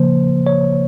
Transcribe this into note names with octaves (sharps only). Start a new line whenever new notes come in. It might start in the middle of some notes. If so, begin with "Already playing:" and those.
Already playing: C#3 F3 A#3 C5
C#5